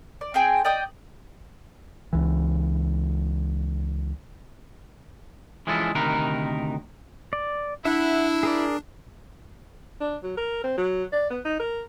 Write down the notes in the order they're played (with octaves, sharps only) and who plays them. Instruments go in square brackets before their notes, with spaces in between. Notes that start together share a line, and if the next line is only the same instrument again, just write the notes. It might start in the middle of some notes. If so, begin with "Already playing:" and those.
[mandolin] D5
C4 G#4 G5 G#5
D5 D#5 G5 D#6
[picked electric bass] C#2 E3
[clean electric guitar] E3 F3 G#3 C#4 E4 A4
D2 C3 D#3 D#4 A#4 B4
[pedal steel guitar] D5
[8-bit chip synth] D4 [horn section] E4 [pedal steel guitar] E5 F#5
[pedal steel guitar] G#4 A#4 D5
[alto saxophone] D4
F#3
A#4
C4
F#3
D5
B3
D#4
A#4